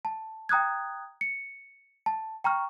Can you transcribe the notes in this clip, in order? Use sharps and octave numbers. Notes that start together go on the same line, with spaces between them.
A5
G5 A#5 D#6 F#6 G#6
C#7
A5
G5 A#5 C#6 F6